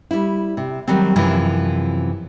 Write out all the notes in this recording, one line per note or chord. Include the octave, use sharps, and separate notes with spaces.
G3 E4
C3
D#3 F#3 G3 C4
F#2 C3 E3 F3